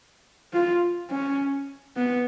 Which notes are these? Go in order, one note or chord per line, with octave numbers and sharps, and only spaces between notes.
F4
C#4
B3